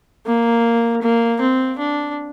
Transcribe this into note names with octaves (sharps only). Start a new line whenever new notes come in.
A#3
A#3
C4
D4